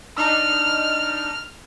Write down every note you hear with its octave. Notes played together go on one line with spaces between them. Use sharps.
D4 D#4 F6